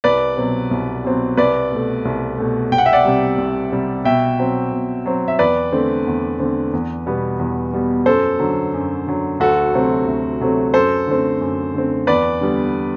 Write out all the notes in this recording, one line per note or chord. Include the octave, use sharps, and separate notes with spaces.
C2 B4 D5
B2 F#3 C4
C2
B2 F#3 C4
C2 B4 D5
B2 A3
C2
B2 A3
C2 G5
F#5
E5
D5 F#5
C3 G3
C2
C3 G3
B2 E5 G5
F#3 C4
B2
F#3 C4
E5
E2 B4 D5
D3 A3 C4
E2
D3 A3 C4
E2
B2 G3 B3
E2
B2 G3 B3
F#2 A4 C5
D3 F#3
F#2
D3 F#3
D2 F#4 A4
C3 F#3 A3 C4
D2
C3 F#3 A3 C4
F#2 A4 C5
D3 A3 C4
F#2
D3 A3 C4
E2 B4 D5
D3 G3 B3